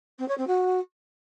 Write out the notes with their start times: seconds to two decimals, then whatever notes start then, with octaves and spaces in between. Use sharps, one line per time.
0.19 C4
0.28 C#5
0.38 C4
0.47 F#4